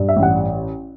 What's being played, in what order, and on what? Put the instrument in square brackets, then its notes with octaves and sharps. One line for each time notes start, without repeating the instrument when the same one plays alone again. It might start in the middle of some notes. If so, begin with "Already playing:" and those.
Already playing: [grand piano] G2
E5
A1
F#5